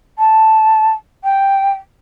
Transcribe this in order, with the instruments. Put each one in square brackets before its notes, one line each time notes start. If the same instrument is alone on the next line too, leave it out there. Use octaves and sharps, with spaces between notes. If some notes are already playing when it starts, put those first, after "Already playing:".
[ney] A5
G5